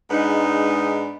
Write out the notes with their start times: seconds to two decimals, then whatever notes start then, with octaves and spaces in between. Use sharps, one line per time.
0.10 G#2 G#3 B3 D4 D#4